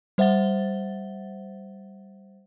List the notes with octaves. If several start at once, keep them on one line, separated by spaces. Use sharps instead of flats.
G3 C5 E5 F#5 A6 G7